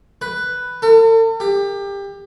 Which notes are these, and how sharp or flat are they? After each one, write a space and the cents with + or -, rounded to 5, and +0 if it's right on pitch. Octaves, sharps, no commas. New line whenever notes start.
B4 +5
A4 +45
G4 +25